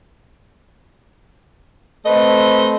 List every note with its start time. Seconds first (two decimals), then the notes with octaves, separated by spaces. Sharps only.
2.06 A3 C4 B4 D#5